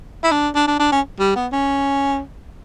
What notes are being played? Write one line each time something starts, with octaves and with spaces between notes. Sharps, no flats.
E4
D4
D4
D4
D4
C#4
G3
B3
C#4